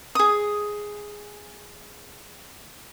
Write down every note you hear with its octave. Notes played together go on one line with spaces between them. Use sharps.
G#4 D#6